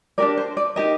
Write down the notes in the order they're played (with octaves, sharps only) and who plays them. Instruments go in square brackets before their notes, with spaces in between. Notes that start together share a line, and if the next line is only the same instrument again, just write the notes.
[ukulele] D4 G4 A#4 D5
C5
D5
D#4 G4 A#4 D#5